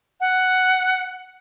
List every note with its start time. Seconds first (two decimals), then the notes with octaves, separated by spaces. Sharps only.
0.20 F#5